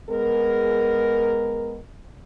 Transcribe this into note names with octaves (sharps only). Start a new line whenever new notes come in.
G#3 B3 G#4 A#4